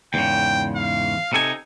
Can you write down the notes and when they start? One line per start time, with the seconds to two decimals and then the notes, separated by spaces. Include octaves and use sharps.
0.14 E2 G#2 C#3 G5
0.76 F5
1.33 C3 D#4 A4 G#5